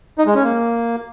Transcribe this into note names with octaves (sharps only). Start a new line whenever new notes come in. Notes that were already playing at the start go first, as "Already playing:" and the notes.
D#4
G#3
C#4
A#3